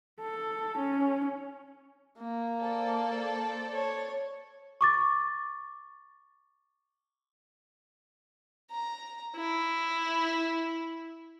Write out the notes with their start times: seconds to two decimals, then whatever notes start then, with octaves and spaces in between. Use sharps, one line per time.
0.21 A4
0.78 C#4
2.18 A#3
2.61 A4 C5 D5
3.73 C#5
4.81 C#6 D6 A6
8.71 A#5
9.36 E4